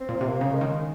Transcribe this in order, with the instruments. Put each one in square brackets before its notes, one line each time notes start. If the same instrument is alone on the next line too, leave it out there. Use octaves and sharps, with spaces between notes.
[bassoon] C4
[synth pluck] A#2
C3
[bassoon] A#3
[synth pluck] C#3
[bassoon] G#3
[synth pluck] D#3